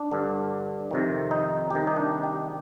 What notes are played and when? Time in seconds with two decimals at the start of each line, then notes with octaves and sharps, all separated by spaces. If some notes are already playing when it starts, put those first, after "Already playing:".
Already playing: D4
0.11 G2 D3
0.91 F2 C3 D#3
1.31 D#4
1.70 C2 C3 D#3 G4
1.87 D#4
1.96 D4
2.23 G4